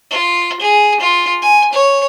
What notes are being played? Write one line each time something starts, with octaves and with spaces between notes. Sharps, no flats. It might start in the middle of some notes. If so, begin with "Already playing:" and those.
F4
G#4
F4
G#5
C#5